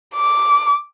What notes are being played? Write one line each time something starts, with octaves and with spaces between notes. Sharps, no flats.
D6